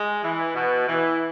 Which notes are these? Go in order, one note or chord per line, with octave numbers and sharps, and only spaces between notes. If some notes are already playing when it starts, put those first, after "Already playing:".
Already playing: G#3
E3
B2
E3